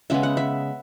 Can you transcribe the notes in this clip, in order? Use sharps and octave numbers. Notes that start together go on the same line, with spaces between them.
C#3 G#3 B3 E5
F#5
E5